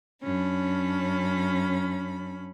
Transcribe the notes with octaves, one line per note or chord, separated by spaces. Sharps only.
F#2 C#4 D4 B5